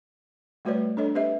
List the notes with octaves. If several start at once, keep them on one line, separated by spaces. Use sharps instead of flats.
G3 A3 F#4 B4 C#5 D5
D4 A4 C#5 D#5
C4 G4 B4 D#5 E5